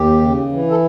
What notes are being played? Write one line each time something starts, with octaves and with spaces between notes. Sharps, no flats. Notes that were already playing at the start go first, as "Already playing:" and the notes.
Already playing: D#2 G4
C#3
E3
A4